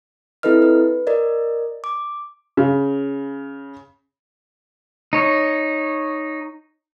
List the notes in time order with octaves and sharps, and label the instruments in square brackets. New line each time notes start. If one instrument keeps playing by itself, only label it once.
[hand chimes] C4 E4 A4 B4 D#5 F6
B4
A#4 D5 D#5
D6
[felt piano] C#3
[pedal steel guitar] D#4 C#5